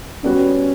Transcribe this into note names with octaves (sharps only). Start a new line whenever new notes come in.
G3 B3 C#4 F#4